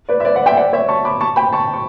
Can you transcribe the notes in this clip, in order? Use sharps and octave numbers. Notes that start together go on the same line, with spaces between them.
B4 D5
E5
B4 D5
D5 F#5
E5 G5
D5 F#5
C#5 E5
A5 C#6
B5 D6
A5 C#6
G5 B5
A5 C#6
C#6